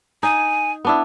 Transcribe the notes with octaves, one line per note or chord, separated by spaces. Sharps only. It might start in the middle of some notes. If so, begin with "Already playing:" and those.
D#4 G#5
B3 D4 E4